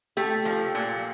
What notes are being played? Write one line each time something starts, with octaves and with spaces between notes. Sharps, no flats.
A3 G4
F3
A#2